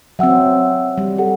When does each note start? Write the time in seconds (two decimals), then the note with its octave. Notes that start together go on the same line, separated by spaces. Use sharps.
0.19 F#3 C4 E5 F#5 E6
0.98 G3
1.18 G4 A4 F#5